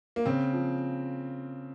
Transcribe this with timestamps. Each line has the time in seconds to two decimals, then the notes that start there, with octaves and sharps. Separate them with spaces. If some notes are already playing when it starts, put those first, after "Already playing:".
0.16 A#3
0.26 C#3 C4
0.53 F3